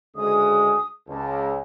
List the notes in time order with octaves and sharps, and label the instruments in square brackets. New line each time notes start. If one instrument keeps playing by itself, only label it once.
[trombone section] D2 C#3 G#3 [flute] D#6
[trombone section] C#2 [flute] A5